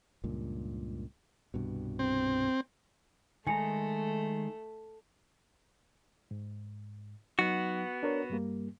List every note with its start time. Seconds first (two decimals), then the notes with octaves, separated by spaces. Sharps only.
0.24 C#2 G2 A#2
1.54 C2 G2 B2
1.99 C4
3.47 D#3 G#3 A3 G#5 A#5 C#7
6.31 G#2
7.39 F#3 B3 D#4 F#4
8.03 D4 A#4 C#5
8.30 G2 G3 A#3